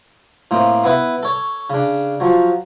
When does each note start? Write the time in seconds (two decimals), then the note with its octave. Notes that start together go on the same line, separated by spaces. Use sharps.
0.51 A2 A#3 C4
0.84 B3 E4 B4
1.23 A4 C#5
1.70 C#3 D4
2.20 F3 F#3